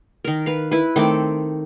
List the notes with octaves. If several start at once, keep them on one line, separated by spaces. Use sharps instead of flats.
D#3 A#4
B4 F5
E4 B4
D#3 A3 C4 D6